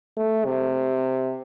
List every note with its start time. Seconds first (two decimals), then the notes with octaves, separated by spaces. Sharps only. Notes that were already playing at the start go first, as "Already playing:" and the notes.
0.17 A3
0.45 C3